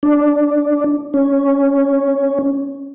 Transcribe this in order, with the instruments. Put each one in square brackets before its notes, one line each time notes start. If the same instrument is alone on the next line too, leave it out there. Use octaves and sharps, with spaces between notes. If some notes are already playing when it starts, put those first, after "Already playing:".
[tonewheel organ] D4
C#4